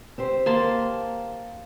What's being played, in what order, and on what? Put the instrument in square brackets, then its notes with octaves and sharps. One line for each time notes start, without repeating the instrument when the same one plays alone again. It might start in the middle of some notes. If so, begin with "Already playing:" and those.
[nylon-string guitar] C4 G4 C5
[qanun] A#3 A5 C6